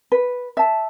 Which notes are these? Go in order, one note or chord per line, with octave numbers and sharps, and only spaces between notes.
B4
E5 A5